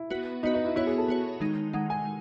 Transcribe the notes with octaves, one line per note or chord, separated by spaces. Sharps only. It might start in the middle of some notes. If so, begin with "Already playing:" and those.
Already playing: E4
B3 F#4 B4
B3 D#4 F#4 B4
D#4
E4
B3 E4 F#4 C#5
G#4
A4
B3 F#4 C#5
D#3 G#3 D#4
D#3 G#3 D#4 F#5
G#5